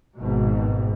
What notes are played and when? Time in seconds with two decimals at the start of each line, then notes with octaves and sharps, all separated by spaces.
0.18 G#1 B2